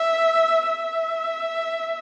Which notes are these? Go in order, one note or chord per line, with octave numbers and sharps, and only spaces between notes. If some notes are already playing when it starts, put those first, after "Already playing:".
Already playing: E5
E5